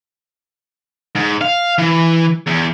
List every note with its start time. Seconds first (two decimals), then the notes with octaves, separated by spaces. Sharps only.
1.16 G#2
1.41 F5
1.78 E3
2.47 E2